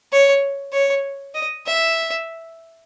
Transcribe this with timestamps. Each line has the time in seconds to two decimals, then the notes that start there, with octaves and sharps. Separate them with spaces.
0.13 C#5
0.73 C#5
1.35 D#5
1.66 E5